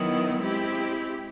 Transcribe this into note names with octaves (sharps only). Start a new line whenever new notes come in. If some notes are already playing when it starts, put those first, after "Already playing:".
Already playing: D#3 F#3 B3 E4
G#3 C4 E4 G4